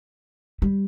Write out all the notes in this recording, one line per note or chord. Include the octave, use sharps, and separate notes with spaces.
G3